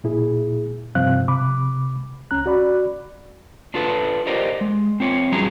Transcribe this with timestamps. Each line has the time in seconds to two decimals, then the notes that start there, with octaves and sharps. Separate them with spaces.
0.04 A#2 E4 G#4
0.95 G2 C3 F3 C4 F5 F#6
1.28 C3 B5 D6
2.31 C#2 C#4 A#5 F#6
2.46 F#4 D5 B5
3.74 D4 F4 A4 B4
4.27 G4 A#4 C5 D5 D#5
4.61 G#3
5.00 C4 F4 C#5
5.32 F2 F#3 G3 C#4 G#4 A#5